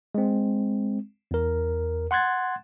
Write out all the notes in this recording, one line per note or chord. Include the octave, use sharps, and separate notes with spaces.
G#3 C4
E2 A#4
F#5 C6 F#6 G#6 A6